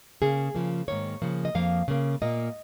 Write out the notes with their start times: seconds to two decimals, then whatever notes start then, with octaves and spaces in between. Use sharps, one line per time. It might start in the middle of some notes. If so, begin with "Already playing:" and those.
0.22 C#3 A#3 G#4
0.55 C#3 F3 A#3
0.88 G#2 D#3 A#3 C#5
1.22 C#3 F3 A#3
1.45 D#5
1.55 F2 F3 A#3 F5
1.88 C#3 A#3
2.22 A#2 A#3 D#5